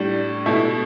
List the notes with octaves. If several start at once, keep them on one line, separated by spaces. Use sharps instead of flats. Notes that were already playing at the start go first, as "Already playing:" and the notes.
Already playing: A2 G3 D4
B2 A3 E4